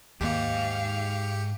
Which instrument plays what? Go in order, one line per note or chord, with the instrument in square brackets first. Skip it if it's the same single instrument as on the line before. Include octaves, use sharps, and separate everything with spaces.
[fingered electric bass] D#2 A#3 [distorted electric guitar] G#2 [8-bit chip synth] G4 C#7 [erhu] F5